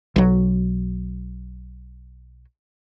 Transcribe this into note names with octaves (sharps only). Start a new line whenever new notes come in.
B1 F#3